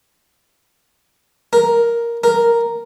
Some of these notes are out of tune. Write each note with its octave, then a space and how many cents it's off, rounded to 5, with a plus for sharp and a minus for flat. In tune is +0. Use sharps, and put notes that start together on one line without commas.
A#4 +5
A#4 +0